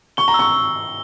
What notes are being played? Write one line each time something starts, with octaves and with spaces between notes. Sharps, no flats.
C#6 G7
A#5
E6
C#6